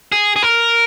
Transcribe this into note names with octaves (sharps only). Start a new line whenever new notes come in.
G#4
G#4
A#4